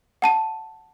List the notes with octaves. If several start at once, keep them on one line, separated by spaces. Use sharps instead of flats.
F#5 A5 D#7